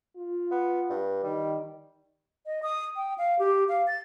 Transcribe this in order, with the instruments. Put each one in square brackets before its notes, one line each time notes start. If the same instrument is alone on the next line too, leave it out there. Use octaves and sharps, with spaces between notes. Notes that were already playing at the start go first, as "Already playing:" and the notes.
[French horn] F4
[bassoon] B3
G2
[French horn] D#3 [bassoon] G3
[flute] D#5
D#6
G5
F5
G4
F5
A6